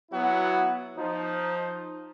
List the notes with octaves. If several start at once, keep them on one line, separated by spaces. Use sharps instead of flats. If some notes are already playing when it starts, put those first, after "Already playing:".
F#3 B3 E4 F#4
F3 D#4